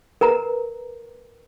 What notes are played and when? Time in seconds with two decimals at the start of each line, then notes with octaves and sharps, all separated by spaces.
0.21 A#4 B4 A#5